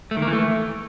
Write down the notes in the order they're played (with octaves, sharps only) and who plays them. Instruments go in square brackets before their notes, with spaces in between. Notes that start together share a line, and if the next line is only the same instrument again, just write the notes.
[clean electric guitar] A3
D#3
A#3
E3
A3